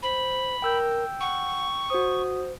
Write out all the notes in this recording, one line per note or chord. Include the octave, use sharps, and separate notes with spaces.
C5 B5
A#4 G5 E6 G6
F#5 C#6
F#4 C5 D#6